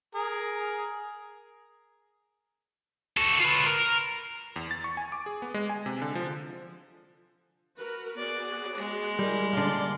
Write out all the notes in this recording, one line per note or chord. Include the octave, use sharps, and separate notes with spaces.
G#4 A#4
F#4 A4
F4 B4
A#4
E2
A6
C#6
G#5
D6
G#4
B3
G#3
G#5
C3
D3
F3
F#4 A#4 B4
B3 F#4 G#4 D5
G#3
G3 E4 G4 A#4
D3 A#3 D5 C6